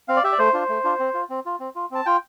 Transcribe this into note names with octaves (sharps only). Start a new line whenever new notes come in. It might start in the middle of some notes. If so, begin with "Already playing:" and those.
C4 F5
D5
G4 E5
D5
A3 C5
D4 F4
A3
D4 F4
C4
F4
C4
F4
C4
F4
C4 A5
F4 G5